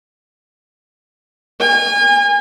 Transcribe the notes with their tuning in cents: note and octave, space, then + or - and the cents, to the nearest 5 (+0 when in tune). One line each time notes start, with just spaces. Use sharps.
G#5 -35